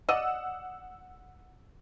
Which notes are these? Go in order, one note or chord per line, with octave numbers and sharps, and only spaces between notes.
D5 D#5 F#5 E6